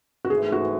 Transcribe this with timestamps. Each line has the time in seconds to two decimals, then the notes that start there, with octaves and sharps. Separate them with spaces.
0.25 F#4
0.30 G#1 G#2 E3 A3 G#4
0.52 F#4